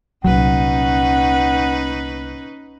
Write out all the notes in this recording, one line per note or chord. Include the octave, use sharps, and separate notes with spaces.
C2 A#2 F#3 C#4 D#4 B4 F#5